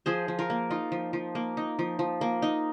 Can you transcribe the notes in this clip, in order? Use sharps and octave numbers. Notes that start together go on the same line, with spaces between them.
F3 G#4 C5
F3
F4 A#4
A#3
D#4 F4
F3
F3
A#3
D#4
F3
F3
A#3
D#4